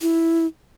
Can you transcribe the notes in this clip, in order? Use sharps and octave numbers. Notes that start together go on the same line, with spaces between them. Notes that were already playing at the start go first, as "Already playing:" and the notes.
E4